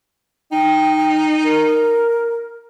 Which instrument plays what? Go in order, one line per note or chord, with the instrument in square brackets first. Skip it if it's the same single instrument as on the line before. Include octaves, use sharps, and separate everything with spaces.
[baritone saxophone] D#4 [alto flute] G5
[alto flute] A#4